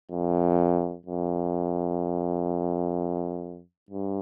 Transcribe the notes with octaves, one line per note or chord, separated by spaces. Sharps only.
F2
F2
G2